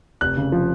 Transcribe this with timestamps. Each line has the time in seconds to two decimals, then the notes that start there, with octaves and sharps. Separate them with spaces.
0.21 F1 F#6
0.37 C#3
0.52 F3